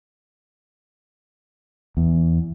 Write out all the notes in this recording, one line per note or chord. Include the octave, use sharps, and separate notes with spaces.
E2